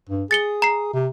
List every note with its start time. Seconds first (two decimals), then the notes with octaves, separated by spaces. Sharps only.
0.09 G2
0.31 G#4 A6 C#7 G7
0.62 A#5 C7
0.93 C3